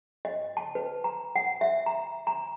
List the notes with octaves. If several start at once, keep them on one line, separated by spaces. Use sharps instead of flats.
D#5
A5
B4
A#5
F#5
E5
A#5
A#5